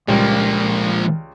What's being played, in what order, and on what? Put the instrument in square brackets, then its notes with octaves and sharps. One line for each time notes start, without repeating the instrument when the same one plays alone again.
[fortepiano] C#2 G3 [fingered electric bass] A#2 G#3 [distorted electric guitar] F3 A#3